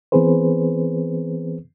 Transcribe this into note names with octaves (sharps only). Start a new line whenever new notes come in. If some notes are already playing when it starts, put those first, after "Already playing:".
E3 B3 C4 G#4 B4 C5